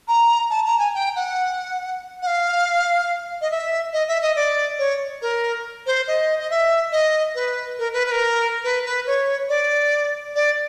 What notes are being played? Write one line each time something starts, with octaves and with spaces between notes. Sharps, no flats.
A#5
A5
A#5
G#5
G5
F#5
F#5
F5
D#5
E5
D#5
E5
D#5
D5
C#5
A#4
C5
D#5
D#5
E5
D#5
B4
A#4
B4
B4
A#4
B4
B4
C#5
D5
D5